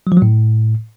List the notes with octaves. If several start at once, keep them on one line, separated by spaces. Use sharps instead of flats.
F#3
F3
F#3
A2